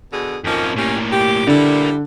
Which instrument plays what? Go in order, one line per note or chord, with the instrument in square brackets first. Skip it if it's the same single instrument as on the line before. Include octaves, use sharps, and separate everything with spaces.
[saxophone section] B2 D3 G#4
[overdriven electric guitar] F2 C#4 [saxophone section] F3 A#3 D#4
[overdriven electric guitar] A2 A#3 [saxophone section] C#4 G4
[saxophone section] G4
[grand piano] D3 [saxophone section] G3 E4 [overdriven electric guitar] A#4 D5